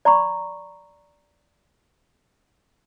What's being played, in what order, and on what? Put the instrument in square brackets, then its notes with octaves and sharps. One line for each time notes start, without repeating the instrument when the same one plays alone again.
[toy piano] D5 A#5 B5 C#6